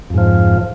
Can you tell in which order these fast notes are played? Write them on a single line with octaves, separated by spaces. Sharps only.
F2 G#2 F3